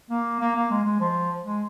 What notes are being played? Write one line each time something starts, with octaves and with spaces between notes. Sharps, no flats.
A#3
A#3
A#3
G#3
G#3
F3
G#3